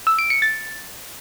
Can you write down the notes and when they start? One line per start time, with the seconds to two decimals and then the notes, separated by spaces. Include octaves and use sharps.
0.07 E6
0.19 D7
0.30 C#7
0.42 A6